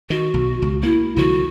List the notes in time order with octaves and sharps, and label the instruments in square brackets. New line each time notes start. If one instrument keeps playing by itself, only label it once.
[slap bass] D#3 [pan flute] F#4
[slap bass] B1
C#2
[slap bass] A#3 [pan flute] E4
[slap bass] C2 D3 F3 [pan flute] F#4